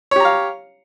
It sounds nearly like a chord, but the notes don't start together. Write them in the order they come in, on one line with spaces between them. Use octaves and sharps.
C#5 G4 A#5 F5